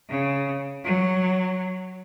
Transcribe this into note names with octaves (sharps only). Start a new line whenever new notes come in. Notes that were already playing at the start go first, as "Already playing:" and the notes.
C#3
F#3